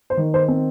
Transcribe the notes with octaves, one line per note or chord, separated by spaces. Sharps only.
C5
D#3
C5
C4